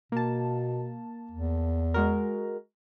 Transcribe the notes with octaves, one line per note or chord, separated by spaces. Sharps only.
B2 A#3 A5
E2
G#3 F#4 A#4